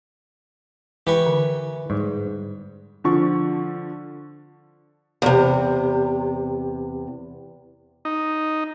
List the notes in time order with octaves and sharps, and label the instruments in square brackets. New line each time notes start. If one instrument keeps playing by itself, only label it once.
[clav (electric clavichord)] E3 [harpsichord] G4 B4 C#6
[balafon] D3
[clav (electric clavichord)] G#2 [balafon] G3
[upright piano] D3 F3 C#6
[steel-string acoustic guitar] E2 C3
[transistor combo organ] D#4